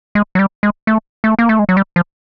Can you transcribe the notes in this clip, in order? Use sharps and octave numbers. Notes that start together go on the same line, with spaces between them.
G#3
F#3
G3
G#3
A3
A3
A#3
A3
G#3
F#3
G3
F3